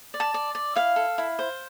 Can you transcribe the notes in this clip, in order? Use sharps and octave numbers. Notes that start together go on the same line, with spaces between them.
D5
A5
D5
D5
E4 F5
A4
E4
C5